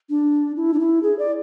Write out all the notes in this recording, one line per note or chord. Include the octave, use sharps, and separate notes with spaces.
D4
E4
D4
E4
G#4
D5